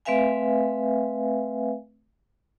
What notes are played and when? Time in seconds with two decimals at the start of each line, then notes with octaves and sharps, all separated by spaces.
0.05 A3 C4 B4 E5 F5 G#5